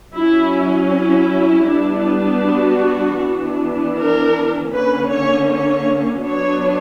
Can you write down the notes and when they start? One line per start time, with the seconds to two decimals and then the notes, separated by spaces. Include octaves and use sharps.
0.14 F#3 C#4 E4
0.91 E4
1.67 G3 B3 D4
2.43 F#4
3.20 E3 B3 D4
3.96 A#4
4.72 D3 A#3 C#4 B4
5.10 C#5
5.49 C#5
6.25 F#3 B3 D4 C#5